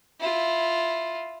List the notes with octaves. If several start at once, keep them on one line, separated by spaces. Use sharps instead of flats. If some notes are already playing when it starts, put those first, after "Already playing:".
E4 F4